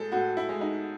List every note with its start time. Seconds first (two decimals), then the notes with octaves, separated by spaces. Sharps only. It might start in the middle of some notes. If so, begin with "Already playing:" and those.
Already playing: A2 G#3 A4
0.12 A2 F#4
0.37 E4
0.49 G#3
0.61 D#4